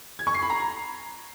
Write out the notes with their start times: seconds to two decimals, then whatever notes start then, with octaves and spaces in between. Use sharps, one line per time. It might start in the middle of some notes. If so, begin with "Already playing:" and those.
0.19 G#6
0.27 C#6
0.34 C7
0.42 B5
0.50 A#5